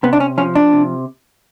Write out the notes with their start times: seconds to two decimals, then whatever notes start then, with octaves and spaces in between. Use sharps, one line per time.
0.03 C3 B3
0.13 D4
0.20 C#4
0.38 F3 C#4
0.55 D4
0.73 C3